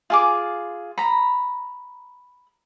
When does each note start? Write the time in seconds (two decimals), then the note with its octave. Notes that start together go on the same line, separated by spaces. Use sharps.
0.10 F4 G#4 D6
0.98 A#5 B5